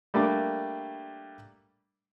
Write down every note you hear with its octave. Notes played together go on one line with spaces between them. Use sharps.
G3 A3 A#3 D4 D6